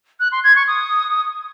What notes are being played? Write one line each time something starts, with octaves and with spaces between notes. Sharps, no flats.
F#6
C6
G#6
C#6
D#6